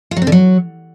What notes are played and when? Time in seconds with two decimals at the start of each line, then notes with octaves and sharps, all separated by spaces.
0.11 F4
0.17 F#3
0.22 C4
0.27 D3
0.32 F#3